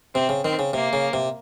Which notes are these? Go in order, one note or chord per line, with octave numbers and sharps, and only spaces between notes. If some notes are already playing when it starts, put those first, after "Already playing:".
C3 C4
C#3
D#3 C4
C#3
C3 A#3
C#3
C3